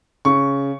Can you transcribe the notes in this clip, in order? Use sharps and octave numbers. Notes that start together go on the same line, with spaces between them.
C#3 C#6